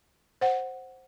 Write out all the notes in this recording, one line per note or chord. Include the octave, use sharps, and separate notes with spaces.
C5 F#5